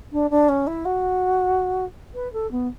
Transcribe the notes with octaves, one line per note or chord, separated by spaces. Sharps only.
D4
D4
C#4
E4
F#4
B4
A4
B3